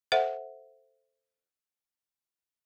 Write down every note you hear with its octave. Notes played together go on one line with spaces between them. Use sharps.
A4 C5 E5 F#5